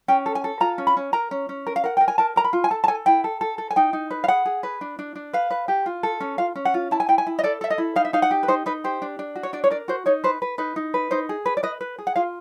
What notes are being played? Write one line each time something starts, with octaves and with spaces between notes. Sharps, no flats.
C#4 G5
A4
G#5
A4
F4 A#5
C#4
B5
C#4
A#4 A#5
C#4
C#4
A#4
F5
A#4 F#5
A#4 G5
G#5
A#4 A5
A#4 A#5
B5
F4
G#5
A4 A5
A5
A4 G#5
E4 G5
A4
A4
A4
G#5
D#4 G5
D#4
B4
F5
G#4 F#5
G#4
B4
D4
D4
D4
B4 F5
B4
G4
F4
A4
C#4
F4 F5
C#4
F#5
F4
E4 A5
G#5
E4 G5
G#5
E4
D#5
A4 D5
A4 E5
D#5
E4
D#4 F5
E5
D#4 F5
F#5
G4
B4
D#4 C5
D#4 B4
G4 C5
D4
D4
F#4
C#5
D4 D5
C#5
A#4 D5
F#4 C5
D#4 C#5
B4 C5
B4
D#4 B4
D#4
B4
D#4 C5
G#4
B4
D5
B4 D#5
B4
G#4
F#5
F4 F5